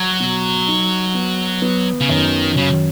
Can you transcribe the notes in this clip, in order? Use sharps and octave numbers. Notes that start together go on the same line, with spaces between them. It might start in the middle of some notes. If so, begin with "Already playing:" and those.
Already playing: F#3
B2
D#4
B3
B3
C#3
F#2 D#3
C#3 F#3